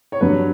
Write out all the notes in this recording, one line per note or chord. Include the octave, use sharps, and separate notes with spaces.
C#5
G2 F#3 B4